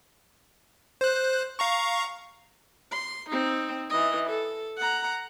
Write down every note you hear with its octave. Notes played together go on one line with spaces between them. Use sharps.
C5 F#6
F5 A#5 C#6
C6
C4 D#4
E3 D#5
A4
F#5 A#5